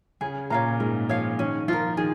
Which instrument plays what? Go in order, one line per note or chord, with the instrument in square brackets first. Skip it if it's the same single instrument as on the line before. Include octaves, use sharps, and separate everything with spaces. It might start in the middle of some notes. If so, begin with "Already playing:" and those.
[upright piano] C#3 C#4 [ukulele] G#4
[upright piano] A#2 A#3 [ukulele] C#5 F5 A#5
[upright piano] G#2 G#3 [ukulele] A#4
[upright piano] F3 [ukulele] C#5 F5
[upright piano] D#3 [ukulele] C#4
[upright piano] F3 [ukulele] F4 A#4
[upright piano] D#3 [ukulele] G#4